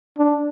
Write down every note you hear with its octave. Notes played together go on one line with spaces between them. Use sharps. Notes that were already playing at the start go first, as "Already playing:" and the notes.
D4